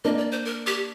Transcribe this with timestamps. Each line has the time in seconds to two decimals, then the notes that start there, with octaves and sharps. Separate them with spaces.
0.04 A#3 D4 D#5
0.17 D5
0.32 C5
0.45 A#4
0.67 G4